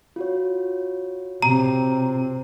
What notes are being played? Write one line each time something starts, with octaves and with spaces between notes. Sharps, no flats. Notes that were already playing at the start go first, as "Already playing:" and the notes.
F4 F#4 C#5
C3 A#5